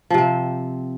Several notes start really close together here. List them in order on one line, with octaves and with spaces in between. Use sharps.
F3 C3 C4